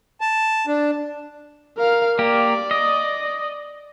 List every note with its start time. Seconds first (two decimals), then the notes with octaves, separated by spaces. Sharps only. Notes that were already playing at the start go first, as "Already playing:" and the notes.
0.21 A5
0.67 D4
1.78 A#4 F5
2.19 A#3 G4 D5
2.71 D#5